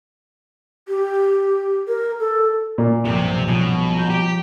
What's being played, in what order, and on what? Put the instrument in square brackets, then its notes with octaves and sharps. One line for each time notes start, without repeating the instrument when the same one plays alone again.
[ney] G4
A#4
A4
[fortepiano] A#2
[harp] B1 G2 F3 [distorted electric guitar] C3 C4
[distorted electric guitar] B2 [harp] F3 C#4 G#4
[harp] A#5 G6
[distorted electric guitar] G4 G5